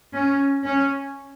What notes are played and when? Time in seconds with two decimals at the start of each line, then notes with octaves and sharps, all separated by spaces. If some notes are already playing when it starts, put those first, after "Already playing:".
0.13 C#4
0.65 C#4